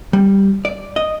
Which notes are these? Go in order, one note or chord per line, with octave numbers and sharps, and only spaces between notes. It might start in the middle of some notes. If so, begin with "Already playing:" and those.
G3
D5
D#5